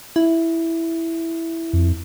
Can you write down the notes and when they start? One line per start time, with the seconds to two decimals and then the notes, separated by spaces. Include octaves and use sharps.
0.16 E4
1.73 F2